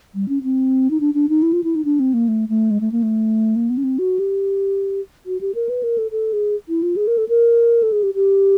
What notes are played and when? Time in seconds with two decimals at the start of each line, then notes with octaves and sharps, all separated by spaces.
0.15 G3
0.29 C#4
0.43 C4
0.91 D#4
1.00 D4
1.14 D4
1.29 D#4
1.42 E4
1.53 F4
1.64 E4
1.75 D#4
1.85 D4
2.00 C4
2.14 A#3
2.28 A3
2.49 A3
2.71 G#3
2.81 A3
2.92 A#3
3.03 A3
3.56 A#3
3.70 B3
3.77 C#4
3.84 C4
3.99 F#4
4.19 G4
5.26 F#4
5.41 G4
5.55 A#4
5.69 B4
5.83 A#4
5.98 A4
6.11 A4
6.33 G#4
6.69 E4
6.83 F4
6.96 G#4
7.07 A#4
7.18 A4
7.29 A#4
7.83 A4
7.92 G#4
8.03 G4
8.15 G4